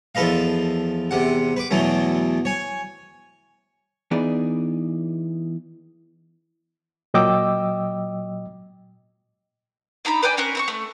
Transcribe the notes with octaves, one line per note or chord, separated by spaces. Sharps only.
E2 F3 A4 B4 D#5 F5
E2 C3 F#5
B4 D6
E2 B2 E3 F#3 A3 B3
C#5 G#5
E3 B3 D#4 G#4 D5
A#2 F#3 D#5 G5 D6 E6
D4 D#4 A#5 B5
B4 D5 G5 G#5
C4 C#4 A#4 F#6
C4 B5 C#6
A3